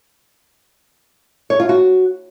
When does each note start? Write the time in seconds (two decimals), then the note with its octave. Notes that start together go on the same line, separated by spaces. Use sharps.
1.50 C#5
1.60 F4
1.69 F#4